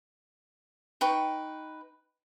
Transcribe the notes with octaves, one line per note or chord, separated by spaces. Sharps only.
D#4 B4 G5 C#6